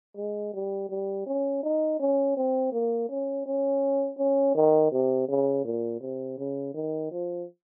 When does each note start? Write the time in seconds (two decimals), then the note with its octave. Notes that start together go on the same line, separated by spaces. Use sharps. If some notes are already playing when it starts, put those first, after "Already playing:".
0.17 G#3
0.54 G3
0.90 G3
1.26 C#4
1.63 D#4
1.99 C#4
2.37 C4
2.72 A#3
3.09 C#4
3.46 C#4
4.18 C#4
4.55 D#3
4.92 C3
5.28 C#3
5.64 A#2
6.01 C3
6.38 C#3
6.74 D#3
7.11 F3